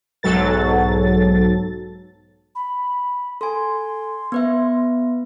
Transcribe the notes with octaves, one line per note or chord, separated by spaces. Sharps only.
B1 G#2 F#3 A4 A6
B5
A4 G#5 C6
B3 B4 E5